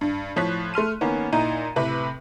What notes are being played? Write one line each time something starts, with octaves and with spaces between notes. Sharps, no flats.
G2
A2 F3 C#5 F#6 B6
A3 C6 F6 D#7
D#3 A#3 B3 C#4
A#2 D#4 E4 A#5 D#7
A2 C3 B4 E5